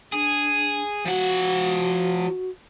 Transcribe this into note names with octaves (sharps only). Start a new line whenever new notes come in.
D4 G#4
F3 F#4 F#5